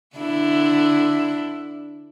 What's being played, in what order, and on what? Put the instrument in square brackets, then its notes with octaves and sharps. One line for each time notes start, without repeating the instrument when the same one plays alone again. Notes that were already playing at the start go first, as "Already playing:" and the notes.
[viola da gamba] D3 D4 E4